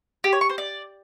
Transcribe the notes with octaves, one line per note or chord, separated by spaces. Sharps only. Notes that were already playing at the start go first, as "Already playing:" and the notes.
G4
C#5
C#6
C5
D5